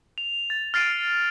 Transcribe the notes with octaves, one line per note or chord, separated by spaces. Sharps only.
F7
A6
F6 A6 C7 D7 D#7